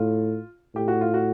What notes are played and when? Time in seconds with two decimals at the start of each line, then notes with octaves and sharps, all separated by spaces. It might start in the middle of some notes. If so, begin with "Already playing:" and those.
Already playing: A2 F4
0.75 A2 G4
0.88 F#4
1.01 F4
1.14 F#4